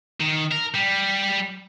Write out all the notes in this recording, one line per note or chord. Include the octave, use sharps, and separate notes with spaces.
D#3
A#4
G3